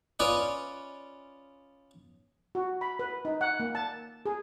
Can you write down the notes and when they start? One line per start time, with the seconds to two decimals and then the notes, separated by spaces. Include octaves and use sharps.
0.20 C#4 F4 B4 D5 D#5
2.55 F#4
2.81 B5
2.99 B4
3.25 D#4
3.41 F#5
3.60 A#3
3.75 A5
4.26 G#4